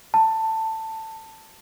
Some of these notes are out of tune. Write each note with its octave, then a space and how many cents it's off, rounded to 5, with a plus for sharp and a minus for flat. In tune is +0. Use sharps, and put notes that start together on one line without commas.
A5 +15